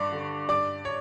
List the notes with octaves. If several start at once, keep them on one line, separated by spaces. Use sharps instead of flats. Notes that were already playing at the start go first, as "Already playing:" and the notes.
Already playing: G2 D5 C#6 D6
D3
G2 D5 D6
C#5